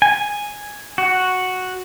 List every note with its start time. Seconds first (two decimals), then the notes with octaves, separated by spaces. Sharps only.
0.02 G#5
0.98 F#4